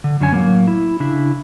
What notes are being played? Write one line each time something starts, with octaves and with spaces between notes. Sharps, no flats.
D3
F#2 D3 C#4 G#5
A2 F#3 A#3 B3
E4
C#3 D4 E4